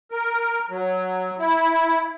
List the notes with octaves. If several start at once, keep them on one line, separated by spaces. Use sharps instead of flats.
A#4
F#3
E4